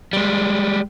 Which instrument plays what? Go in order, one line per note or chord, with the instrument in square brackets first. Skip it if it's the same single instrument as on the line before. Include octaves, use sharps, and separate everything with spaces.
[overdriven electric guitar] G3 G#3